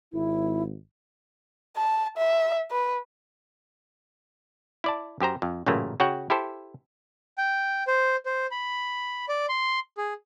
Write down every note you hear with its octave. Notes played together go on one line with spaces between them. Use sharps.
G#1 E4
A5
E5
B4
E4 D5 A5
F#2 G4 C5 A#5
F2
A1 F#2 A#2 C#3 A3 A#3
C#3 F#4 C#5 F#5 G5
E4 G4 A4 C5
G5
C5
C5
B5
D5
C6
G#4